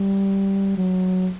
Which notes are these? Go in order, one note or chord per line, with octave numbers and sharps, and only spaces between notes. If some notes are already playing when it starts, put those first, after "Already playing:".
Already playing: G3
F#3